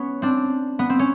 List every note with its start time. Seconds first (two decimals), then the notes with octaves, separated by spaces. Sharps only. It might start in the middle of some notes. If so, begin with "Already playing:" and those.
Already playing: B3 C#4
0.22 C4 D4
0.79 B3
0.90 C4
0.99 C#4